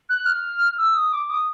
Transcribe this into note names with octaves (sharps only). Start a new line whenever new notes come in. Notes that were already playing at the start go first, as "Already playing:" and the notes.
F#6
F6
E6
D#6
D6
D#6